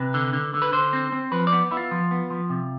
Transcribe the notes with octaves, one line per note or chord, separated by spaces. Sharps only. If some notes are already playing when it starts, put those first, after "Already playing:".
Already playing: C3 B4
D3
D3
D3
B4
D3 C5
C4
C4
F3 B4
D5
B3
B3 E4
F4
F3
B3
F3
C3